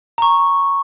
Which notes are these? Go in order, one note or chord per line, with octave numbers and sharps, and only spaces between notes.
A#5 C#6